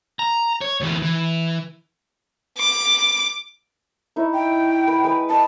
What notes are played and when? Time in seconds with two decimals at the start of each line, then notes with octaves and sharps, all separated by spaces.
0.19 A#5
0.61 C#5
0.81 D2 E3
1.03 E3
2.59 D6
4.16 D#4 E4 C#5
4.34 G5
4.88 B4
5.04 G#3 B4
5.30 D#5 A5